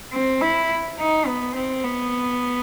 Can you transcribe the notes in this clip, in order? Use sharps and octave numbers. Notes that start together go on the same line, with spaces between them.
C4
E4
D#4
B3
C4
B3